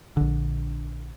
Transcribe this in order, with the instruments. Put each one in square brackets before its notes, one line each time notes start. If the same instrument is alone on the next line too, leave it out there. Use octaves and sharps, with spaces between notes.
[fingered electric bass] A#1 D3